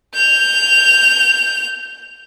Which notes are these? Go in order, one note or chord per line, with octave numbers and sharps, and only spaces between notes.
G6 F7